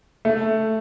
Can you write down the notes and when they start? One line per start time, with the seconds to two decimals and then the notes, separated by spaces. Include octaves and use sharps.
0.25 A3